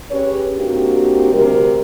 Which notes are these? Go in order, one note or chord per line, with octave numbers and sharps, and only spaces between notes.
C#4 G4 G#4 B4 C#5
A#3 C4 D4 D#4 F#4 G4
D2 C3 G3 F#4 A#4